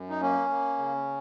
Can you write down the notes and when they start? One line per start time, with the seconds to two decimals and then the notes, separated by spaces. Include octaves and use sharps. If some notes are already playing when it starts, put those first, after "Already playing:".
Already playing: F#2
0.10 D#4
0.21 A#3 C#4
0.50 A#3
0.78 C#3